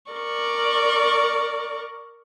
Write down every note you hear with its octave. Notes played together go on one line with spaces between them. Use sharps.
A#4 D5 C#6